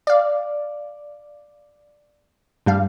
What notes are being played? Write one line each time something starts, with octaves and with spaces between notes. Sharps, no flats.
D5 F5
G2 G3 F5